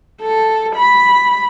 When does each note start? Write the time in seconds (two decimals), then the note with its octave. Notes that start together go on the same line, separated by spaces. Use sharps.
0.22 A4
0.76 B5